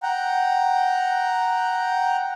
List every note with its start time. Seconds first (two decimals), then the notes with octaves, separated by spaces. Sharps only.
0.03 F#5 G5 A#5